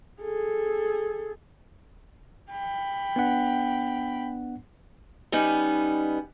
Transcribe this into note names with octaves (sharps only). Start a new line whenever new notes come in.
G#4 A4
G5 B5
B3 D4 F#5
G3 B3 C#4 D#4